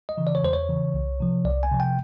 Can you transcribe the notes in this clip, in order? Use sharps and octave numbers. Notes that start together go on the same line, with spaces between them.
D#5
C#3 E3
D5
C#5
E2 C5
C#5
C#3 E3
C2
C3 F3
C2 D5
G#5
C3 F3
G5